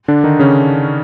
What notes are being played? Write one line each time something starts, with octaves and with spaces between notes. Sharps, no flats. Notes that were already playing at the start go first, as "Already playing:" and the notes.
D3 D4
D#3 D#4
C#3 C#4